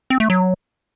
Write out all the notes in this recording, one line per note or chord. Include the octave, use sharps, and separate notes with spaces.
C4
A3
F#3